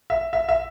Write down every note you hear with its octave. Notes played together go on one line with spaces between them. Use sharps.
E5
E5
E5